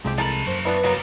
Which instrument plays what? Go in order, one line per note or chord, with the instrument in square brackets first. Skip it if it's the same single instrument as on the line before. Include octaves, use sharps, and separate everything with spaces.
[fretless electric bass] C2 C3 G#3 [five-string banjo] F3 C4 G4
[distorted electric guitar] F3 B5 [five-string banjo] A4 A#4 A5
[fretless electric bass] F#2 [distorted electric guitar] A#3 F#4 [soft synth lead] C5
[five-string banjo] B3 D4 E4 [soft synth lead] B4
[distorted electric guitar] C#3 G3 [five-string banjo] F#3 A#3 B3